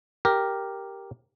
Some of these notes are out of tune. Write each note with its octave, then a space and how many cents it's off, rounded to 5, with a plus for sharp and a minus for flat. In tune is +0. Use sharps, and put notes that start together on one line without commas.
G4 +0 A#4 +0